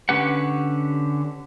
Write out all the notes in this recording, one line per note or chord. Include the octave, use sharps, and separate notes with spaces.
D3 C#4 G4 B4 F#5